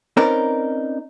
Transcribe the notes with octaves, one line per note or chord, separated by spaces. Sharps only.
C4 C#4 D#4 A#4 B4 D5